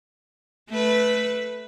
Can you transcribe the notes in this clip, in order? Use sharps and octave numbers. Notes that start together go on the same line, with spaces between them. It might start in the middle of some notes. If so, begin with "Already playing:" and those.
A3 B4